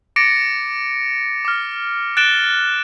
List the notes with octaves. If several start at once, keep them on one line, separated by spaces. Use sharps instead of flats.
D6 A6 A#6 C#7 D7
D6 F6
F#6 A6 D7 E7 G7